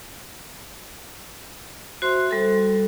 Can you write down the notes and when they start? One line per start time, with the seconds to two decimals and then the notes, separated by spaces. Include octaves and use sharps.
2.02 F#4 C5 E5 C6
2.31 G3 A4